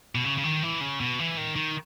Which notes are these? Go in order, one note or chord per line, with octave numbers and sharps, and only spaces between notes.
B2
C#3
C#3
D#3
E3
C#3
B2
E3
D#3
D#3